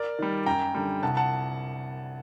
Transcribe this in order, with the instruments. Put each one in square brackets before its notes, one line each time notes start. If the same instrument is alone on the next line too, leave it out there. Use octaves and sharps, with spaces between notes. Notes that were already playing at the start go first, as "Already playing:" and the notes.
Already playing: [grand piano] A#4 D5
D#3 G3
F#2 G5 A#5
D3 G3
C2 F#5 A5
F#5 A5